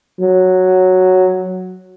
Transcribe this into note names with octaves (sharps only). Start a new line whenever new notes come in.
F#3